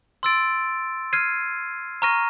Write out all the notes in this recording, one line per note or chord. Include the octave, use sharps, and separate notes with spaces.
C6 E6 A6 D7
F6 G#6 C7 D#7
A#5 C#6 F6 A#6 D#7